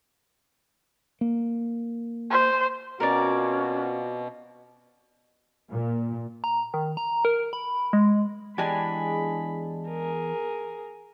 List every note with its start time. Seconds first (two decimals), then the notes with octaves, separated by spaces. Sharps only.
1.21 A#3
2.30 C5
3.00 B2 C4 C#4 F4 F#4 A#4 C#5 D5
5.69 A#2
6.44 A#5
6.74 D#3
6.97 A#5
7.25 A#4
7.53 B5
7.93 G#3
8.58 E2 G#3 D4 G4 G#5 B5
9.88 G#4 A#4